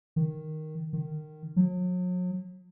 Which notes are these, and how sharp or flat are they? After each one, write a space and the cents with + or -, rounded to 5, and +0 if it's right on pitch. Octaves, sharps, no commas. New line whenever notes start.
D#3 +0
D#3 -20
F#3 -40